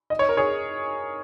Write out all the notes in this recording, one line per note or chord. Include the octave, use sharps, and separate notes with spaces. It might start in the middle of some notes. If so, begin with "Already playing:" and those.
D#5
C#5
A#4
G#4 C#5